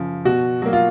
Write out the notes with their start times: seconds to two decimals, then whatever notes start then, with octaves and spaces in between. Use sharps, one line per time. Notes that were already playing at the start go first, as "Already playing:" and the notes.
Already playing: F#2 C#3 F3
0.25 B2 F#4
0.62 F#3 A#3 F#4
0.73 F4